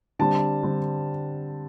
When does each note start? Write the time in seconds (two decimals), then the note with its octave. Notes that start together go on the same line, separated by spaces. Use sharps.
0.19 D3 G3 C4 A5
0.63 D3 G3 C4